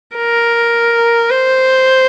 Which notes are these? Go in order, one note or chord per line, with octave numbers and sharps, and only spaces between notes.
A#4
C5